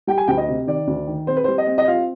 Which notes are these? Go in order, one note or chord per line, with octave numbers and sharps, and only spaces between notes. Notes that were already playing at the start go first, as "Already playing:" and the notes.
G3 G5
G#5
D2 G5
D#5
C3
D#3 D5
D2
D#3
C4 C5
B4
G3 C5
D#5
C4
D#5
F4 F5